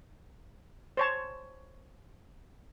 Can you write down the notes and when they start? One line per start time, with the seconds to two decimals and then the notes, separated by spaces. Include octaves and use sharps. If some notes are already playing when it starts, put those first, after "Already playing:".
0.97 C5 C#5 A5